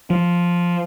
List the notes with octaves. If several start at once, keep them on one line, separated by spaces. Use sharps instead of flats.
F3